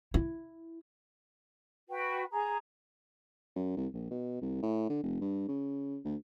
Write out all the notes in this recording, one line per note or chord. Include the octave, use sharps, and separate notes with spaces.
E4
F#4 B4 G5
G#4 A#5
F#2
C2
A#1
B2
C2
A2
D3
F1
G2
C#3
D2